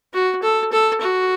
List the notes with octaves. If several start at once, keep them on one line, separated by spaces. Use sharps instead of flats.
F#4
A4
A4
F#4